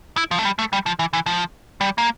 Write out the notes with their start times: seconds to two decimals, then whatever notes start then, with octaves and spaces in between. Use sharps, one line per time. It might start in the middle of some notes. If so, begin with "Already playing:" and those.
0.17 E4
0.31 F3
0.39 A3
0.45 G3
0.59 A3
0.73 G3
0.86 F3
0.99 E3
1.13 E3
1.26 F3
1.81 G3
1.98 A#3